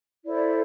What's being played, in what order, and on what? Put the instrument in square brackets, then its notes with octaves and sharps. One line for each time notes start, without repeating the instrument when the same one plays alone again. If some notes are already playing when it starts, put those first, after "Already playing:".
[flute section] E4 A4 C5 D5